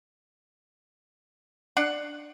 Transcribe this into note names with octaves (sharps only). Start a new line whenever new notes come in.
D4 F#5